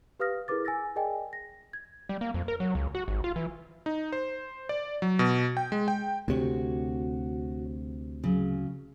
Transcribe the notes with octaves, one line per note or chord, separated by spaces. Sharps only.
G4 B4 F5 D#6 F6 A#6
E4 G#4 A#4 B4 D6 A6
G#5 E6 A6 A#6
G#4 A#4 D5 D#5 G5 G#5
A#6
G#6
G3
A#3
F2
A#4
F#3
C#2
F#4
G#1
F4
E3
D#4
C5
D5
F#3
B2
G5
G#3
G5
D2 C3 F#4 C#5
C#3 F#3